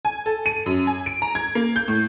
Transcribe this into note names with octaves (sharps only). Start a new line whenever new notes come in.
G#5
A4
D#7
F#2
G#5
D7
A#5
G#6
A#3
G6
A2